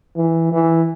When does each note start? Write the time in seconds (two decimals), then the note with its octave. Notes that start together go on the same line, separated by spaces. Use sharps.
0.16 E3
0.52 E3